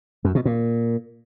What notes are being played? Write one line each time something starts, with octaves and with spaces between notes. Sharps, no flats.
F#2
B2
A#2